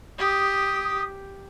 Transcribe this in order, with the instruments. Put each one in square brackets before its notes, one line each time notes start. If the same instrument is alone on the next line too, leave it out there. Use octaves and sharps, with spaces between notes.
[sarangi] G4 [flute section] D#6